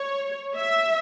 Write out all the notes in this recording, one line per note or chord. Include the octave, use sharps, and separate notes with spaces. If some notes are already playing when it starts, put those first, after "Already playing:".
Already playing: C#5
E5